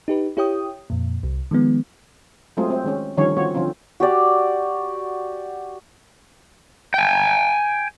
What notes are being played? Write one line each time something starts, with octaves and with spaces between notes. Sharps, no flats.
D#4 G4 B4
E4 G4 C#5 G5 D#6
F2 A#2
C2
D#3 F3 G#3 B3
F#3 G#3 A3 C4 F4 G#4
C4
D#3 G#3 C#4
D3 D#3 F3 G3 C#4 C#5
D#3 C4 F4 F#4 C#5
D3 F3 C4 C#4 F4
F#4 G4 D5
G5 G#5